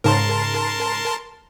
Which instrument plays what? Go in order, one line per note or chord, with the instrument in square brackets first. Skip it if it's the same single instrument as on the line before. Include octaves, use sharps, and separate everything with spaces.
[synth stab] G#2 C#3 [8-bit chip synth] A#4 A5 C6